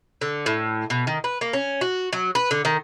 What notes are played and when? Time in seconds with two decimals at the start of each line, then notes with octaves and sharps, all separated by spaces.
0.21 D3
0.46 A2
0.90 B2
1.07 D#3
1.24 B4
1.41 A#3
1.53 C#4
1.81 F#4
2.13 F#3
2.35 B4
2.51 D3
2.65 D#3